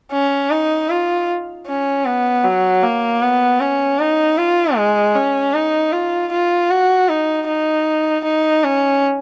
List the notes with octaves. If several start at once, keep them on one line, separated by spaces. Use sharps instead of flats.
C#4
D#4
F4
C#4
B3
F#3
A#3
B3
C#4
D#4
F4
G#3
C#4
D#4
F4
F4
F#4
D#4
D#4
D#4
C#4